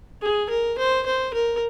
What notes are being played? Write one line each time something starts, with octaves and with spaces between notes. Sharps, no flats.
G#4
A#4
C5
C5
A#4